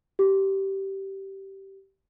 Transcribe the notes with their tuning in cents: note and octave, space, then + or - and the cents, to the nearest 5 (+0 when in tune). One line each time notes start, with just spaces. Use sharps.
G4 -15